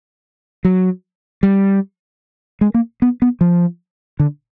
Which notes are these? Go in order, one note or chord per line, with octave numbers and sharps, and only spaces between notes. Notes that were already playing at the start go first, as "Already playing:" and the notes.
F#3
G3
G#3
A#3
B3
B3
F3
D3